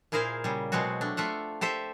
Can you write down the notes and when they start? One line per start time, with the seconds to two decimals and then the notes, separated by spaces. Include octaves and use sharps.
0.12 A#2 E4 G#4 A#4 C5 F5
0.44 C#3 G3
0.72 B2 F#3 G#3 C4 F#4
1.01 A3 D4
1.17 A3 F4 E5 F#5
1.61 G4 A4 C5 E5